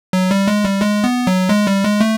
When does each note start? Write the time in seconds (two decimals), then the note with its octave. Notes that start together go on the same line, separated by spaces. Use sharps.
0.13 F#3
0.31 G3
0.48 G#3
0.65 G3
0.82 G#3
1.04 B3
1.27 F#3
1.49 G#3
1.67 G3
1.84 G#3
2.01 A3